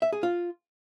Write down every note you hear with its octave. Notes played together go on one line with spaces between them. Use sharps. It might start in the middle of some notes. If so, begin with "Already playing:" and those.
E5
G#4
F4